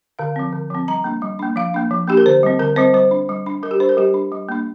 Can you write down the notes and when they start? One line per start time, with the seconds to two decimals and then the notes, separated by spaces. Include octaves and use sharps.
0.19 D3 F5
0.36 F3 C4
0.53 D3
0.70 F3 C4
0.88 G3 A#5
1.04 A#3 D4
1.22 G3
1.39 A#3 D4
1.56 F3 F5
1.74 A#3 D4
1.91 F3
2.07 A#3 D4 G4
2.17 A#4
2.26 D3 C5
2.43 G3 C4
2.59 D3 A#4
2.76 G3 C4 C5
2.94 G3 C5
3.11 D4
3.29 G3
3.46 D4
3.63 G3 A#4
3.71 G4
3.80 D4 C5
3.89 A#4
3.97 G3 G4
4.14 D4
4.32 G3
4.49 A#3 D4